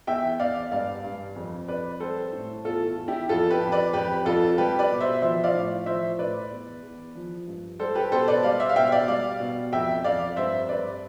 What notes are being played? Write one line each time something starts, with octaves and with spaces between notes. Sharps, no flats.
E2 E5 G5
E2 D5 F5
G2 D5 F5
G2
F2
F2 B4 D5
G3 A4 C5
A2
E2 F4 A4
E2
E4 G4
F2 F4 A4
G4 B4
F2
B4 D5
F2 G4 B4
F2 F4 A4
G3 G4 B4
B4 D5
B2
C5 E5
F3 C5 E5
D5 F5
A2
F3 C5 E5
A2 B4 D5
E2
E2
F3
G2
G3 A4 C5
G4 B4
B2 A4 C5
B4 D5
G3 D5 F5
C5 E5
F5
B2 E5 G5
D5 F5
G3 D5 F5
B2
F2 E5 G5
F2 D5 F5
G2 C5 E5
G2 B4 D5